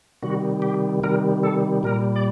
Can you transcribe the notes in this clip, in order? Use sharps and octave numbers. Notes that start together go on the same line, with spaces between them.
C3 D#3 G3 F#4
G4
C3 D#3 G3 A#4
A4
A#2 G3 A#4
D5